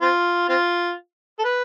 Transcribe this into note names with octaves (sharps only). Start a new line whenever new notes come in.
C4 F4
C4 F4
A4
B4